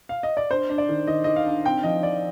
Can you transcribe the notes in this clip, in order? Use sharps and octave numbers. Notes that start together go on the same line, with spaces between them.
F5
D#5
D5
D4 C5
D4
D5
D#3
D#3 D#5
D#3 D#5
F5
D4
C4 G5
F3 D#5
F3 D5